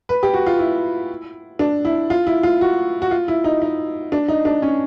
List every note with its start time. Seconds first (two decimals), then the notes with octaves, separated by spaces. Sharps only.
0.09 B4
0.23 G4
0.34 F#4
0.47 F4
0.59 E4
1.59 D4
1.85 E4
2.10 F4
2.27 E4
2.43 F4
2.61 F#4
3.02 F#4
3.11 F4
3.28 E4
3.44 D#4
3.62 D#4
4.12 D4
4.28 D#4
4.45 D4
4.62 C#4